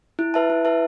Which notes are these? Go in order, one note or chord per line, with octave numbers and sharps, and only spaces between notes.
E4
B4 E5 A5
E4
B4 E5 A5